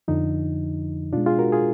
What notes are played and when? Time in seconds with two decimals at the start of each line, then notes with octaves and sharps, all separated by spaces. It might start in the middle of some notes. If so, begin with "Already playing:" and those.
0.08 F2 D3 F3 D#4
1.13 B2 G#3 D4 F4
1.26 F4 G#4
1.39 F#4 A#4
1.52 F4 G#4